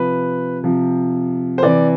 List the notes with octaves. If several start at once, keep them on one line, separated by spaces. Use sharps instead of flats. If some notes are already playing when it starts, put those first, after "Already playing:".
Already playing: C3 F3 B4
C3 F3
C5
C3 E3 D5